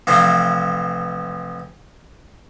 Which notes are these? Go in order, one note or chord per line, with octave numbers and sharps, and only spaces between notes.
A1 C3 E3 F3